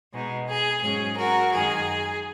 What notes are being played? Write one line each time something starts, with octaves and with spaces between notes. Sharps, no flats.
B2 G#3 D#4
G#4
G#2 F#3 C#4 G#4
F#4 A#4
F#2 D#3 G#3 G#4